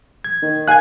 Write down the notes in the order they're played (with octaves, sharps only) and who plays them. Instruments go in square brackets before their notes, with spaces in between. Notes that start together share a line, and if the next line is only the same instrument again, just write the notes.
[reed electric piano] G#6
[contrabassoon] D#3
[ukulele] F5 G#5 [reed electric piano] F#6 G#6